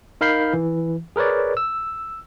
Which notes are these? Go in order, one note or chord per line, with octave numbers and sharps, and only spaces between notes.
D#4 A#4 F5 B5 G6 C7
E3
G#4 A#4 B4 C#5 D5
E6